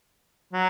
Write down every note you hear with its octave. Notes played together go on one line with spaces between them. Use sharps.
F#3